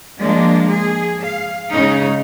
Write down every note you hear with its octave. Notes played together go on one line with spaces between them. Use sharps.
F3 G#3 A#3 D4
G#4
F5
C#3 G#3 D#4